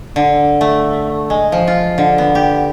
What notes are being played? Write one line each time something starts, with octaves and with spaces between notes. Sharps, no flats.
D3
A3
G#3
F3
F4
D3
B3
G4